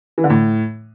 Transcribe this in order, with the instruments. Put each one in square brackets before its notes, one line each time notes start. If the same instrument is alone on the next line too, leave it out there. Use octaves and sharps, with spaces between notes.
[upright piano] E3
D3
A2